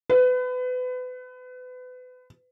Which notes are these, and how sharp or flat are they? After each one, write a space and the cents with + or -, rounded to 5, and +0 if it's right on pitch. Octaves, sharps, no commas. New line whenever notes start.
B4 +30